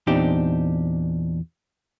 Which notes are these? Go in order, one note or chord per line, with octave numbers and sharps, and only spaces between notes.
E2 A#2 C4 D4 D#4 G4